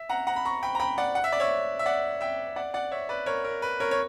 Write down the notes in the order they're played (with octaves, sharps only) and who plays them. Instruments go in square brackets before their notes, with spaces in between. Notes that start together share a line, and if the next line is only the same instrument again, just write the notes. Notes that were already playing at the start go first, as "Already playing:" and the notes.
Already playing: [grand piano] E5
F#5 A#5
F#5 A#5
B5
A#5 C#6
G5 B5
A#5
G5 B5
D5 F#5
F#5
E5
D5
C#5 E5
E5
D5 F#5
E5 G5
D5 F#5
D5 F#5
C#5 E5
B4 D5
A#4 C#5
A#4
B4
A#4 C#5
C#5